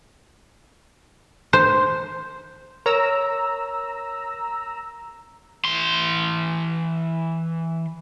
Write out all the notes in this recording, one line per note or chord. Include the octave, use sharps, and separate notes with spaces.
C5
A#4 C#5 A#5 E6
E3 C6